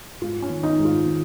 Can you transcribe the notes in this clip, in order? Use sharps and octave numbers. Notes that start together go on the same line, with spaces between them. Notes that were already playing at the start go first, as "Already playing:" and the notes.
G#2 F4
C#4
D#3
D#4
G#2
F4
D#3